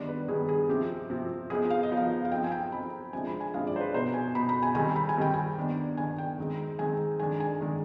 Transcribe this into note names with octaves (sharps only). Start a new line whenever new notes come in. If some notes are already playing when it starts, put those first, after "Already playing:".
Already playing: D#3 G3 B3 D4 D5
B4
D#3 G3 B3 D4 G#4
G#4
C3 F3 C4 G4
C3 F3 C4
F3 B3 D#4 G#4
F5
D#5
F3 B3 D#4
F5
F5
F3 C4 D#4 G5
G#5
G5
F3 C4 D#4 B5
C3 F3 G#3 D4 G#5
B5
G#5
C3 F3 G#3 D4 F5
D5
C5
B4
B2 B3 D#4 C5
G#5
B2 B3 D#4 B5
B5
G#5
D#3 G3 C4 D#4 G#5
B5
G#5
D#3 G3 C4 D#4 G5
G#5
D#3 B3 D4
D#3 B3 D4 G#5
G5
D#3 G#3 C4 D#4
D#3 G#3 C4 D#4 G#5
D#3 G#3 D4 G#5
G#5
D#3 G#3 D4